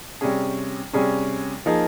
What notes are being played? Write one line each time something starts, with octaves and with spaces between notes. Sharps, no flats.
C3 G3 C#4 G#4
C3 G3 C#4 G#4
F3 A#3 D#4 G#4